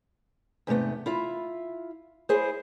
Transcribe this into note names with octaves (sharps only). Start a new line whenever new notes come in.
E2 G#2 C3 A3 B3
E4 F4 E5
E4 G#4 C5